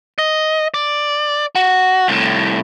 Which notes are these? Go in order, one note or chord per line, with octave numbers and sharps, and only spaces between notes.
D#5
D5
F#4
C2 A2